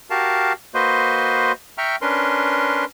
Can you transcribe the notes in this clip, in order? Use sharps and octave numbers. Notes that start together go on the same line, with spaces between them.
F#4 G4 A#4 F5 A5
A#3 F#4 B4 C5 D#5 C6
E5 G5 A#5 C#6 F6
C#4 D4 A#4 B4 C6